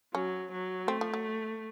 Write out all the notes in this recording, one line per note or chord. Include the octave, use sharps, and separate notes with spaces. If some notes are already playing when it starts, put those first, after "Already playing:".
F#3 C#4
F#3
A3 C4
F3
F#3